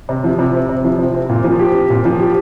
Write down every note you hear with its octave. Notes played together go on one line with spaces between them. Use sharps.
C3
F3
C3
C4
C3
F3
C3
C4
A#2
F3
G4
C4
A#2
F3
G4